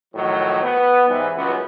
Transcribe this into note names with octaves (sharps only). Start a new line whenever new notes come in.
A2 D#3 F3 F#3
B3
G#2 E3 G3
C#2 F#2 B3